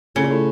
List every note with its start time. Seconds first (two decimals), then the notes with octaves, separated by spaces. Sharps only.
0.15 A2 C#3
0.23 A#2
0.30 A2